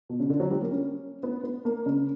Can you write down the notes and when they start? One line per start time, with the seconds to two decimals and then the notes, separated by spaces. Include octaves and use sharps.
0.09 B2
0.20 C#3
0.30 D3
0.40 F#3
0.51 G3
0.62 A#3
0.71 C#4
1.23 B3
1.43 B3
1.65 A#3
1.86 C#3